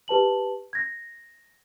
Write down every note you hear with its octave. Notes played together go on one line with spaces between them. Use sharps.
G4 B4 A5 F#7
G#6 A#6